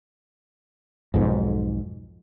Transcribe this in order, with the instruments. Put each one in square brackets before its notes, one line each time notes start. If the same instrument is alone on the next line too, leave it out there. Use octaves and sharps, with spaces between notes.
[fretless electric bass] B1 F2 G#2